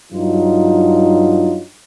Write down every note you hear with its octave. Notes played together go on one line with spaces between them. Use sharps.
G2 F#3 D#4 F4